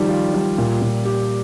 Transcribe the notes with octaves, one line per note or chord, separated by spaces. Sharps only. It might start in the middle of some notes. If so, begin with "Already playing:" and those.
Already playing: D#3 F3 G3
F4
G3
A#2
A#2
G4